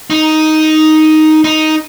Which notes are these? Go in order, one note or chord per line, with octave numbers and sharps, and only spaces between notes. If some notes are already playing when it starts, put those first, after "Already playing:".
D#4
D#4